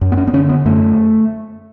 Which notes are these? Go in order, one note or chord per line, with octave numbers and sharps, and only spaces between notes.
F#2
B3
C#4
B3
D3 C#4
B3
F#2 A3